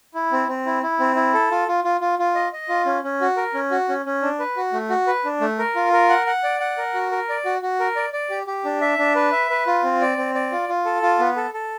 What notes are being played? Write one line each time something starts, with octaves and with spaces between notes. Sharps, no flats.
E4
C4
C4
E4
E4
C4
E4
A4
F4
F4
F4
F4
F4
D#5
D#5
F4
C#4
C#4
F#4
A#4
C#4
F#4
C#4
C#4
D4
B4
F#4
A3
F#4
B4
D4
A3
A#4
F4
A#4
F#5
F#5
D5
F#5
A#4
F#4
A#4
D5
F#4
F#4
A#4
D5
D5
G4
G4
D4
E5
D4
B4
E5
B4
F4
C4
D5
C4
D5
F4
F4
A4
F4
B3
A4
A4